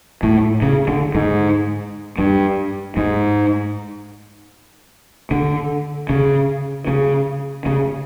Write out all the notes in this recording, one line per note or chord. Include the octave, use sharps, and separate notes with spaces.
A2
C#3
D3
G#2
G2
G#2
D3
C#3
C#3
C#3